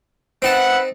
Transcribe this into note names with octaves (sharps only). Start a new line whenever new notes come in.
C4 D#4 B4 E5 F#5 A5